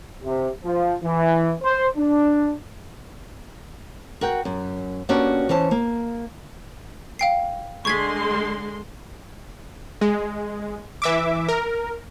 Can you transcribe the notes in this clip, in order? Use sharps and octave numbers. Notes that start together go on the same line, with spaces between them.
C3
F3
E3
C5
D4
F#4 A#4 F#5 G5
F#2
A#3 B3 C#4 D4 F#4 G4
E3 C#4 C5 A5
A#3
F5 G5 C7
D3 G#3 C6 C#6 G#6 B6
G#3
E3 E5 D6
A#4